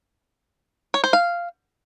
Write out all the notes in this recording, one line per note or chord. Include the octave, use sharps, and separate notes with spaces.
C#5
C5
F5